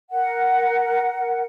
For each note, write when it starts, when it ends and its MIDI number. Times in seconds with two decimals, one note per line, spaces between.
0.11 1.43 70
0.11 1.43 78